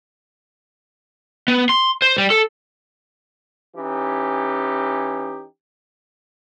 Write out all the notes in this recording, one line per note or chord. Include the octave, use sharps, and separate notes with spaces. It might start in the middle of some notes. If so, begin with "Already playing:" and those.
B3
C6
C5
G3
A4
E3 C#4 D#4 G4